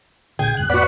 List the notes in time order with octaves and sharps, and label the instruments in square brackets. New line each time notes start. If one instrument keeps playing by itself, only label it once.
[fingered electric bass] A#1 A#2 D3 [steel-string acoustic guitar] G#4 [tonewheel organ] G5 G#6
[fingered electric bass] E2 G2 C#3 [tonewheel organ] F#6
[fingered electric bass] E2 G#2 B2 [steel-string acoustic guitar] B3 F#4 [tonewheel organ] D5 F#5 B5